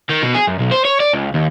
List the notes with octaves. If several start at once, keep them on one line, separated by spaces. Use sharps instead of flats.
D#3
B2
G#4
F#2
B1
C5
C#5
D5
C#2
D#2